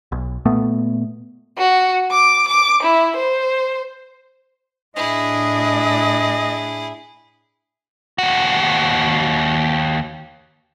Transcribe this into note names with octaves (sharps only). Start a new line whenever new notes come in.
B1
A#2 A3 B3
F#4
D6
D6
E4
C5
A2 D4 E4 G#4 D#5
D#2 F#4